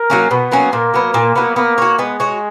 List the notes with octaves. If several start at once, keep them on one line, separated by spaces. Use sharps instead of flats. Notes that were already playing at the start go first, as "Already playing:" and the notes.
Already playing: A#4
F#3 A#3 C#4
B2 B3
F#3 A#3 C#4
A#2 A#3
F#3 B3
A#2
F#3 B3
A#3 B3
F#4 C#5
G#3 B3
F#4 C#5